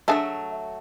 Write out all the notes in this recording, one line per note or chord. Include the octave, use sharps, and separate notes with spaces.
F#3 A3 D4 G#4 A4 E5